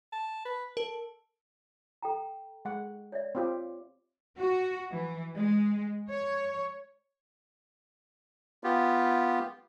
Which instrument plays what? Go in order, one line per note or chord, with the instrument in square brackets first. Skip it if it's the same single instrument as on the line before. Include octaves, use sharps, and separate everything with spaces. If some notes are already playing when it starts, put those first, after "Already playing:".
[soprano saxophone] A5
B4
[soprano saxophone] A4 [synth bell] A#4
[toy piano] A4 G5 A#5
[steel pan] G#3 F#5
[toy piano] C#5 D5 E5
[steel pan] C4 F4 G4
[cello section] F#4
E3
G#3
C#5
[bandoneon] B3 F4 G4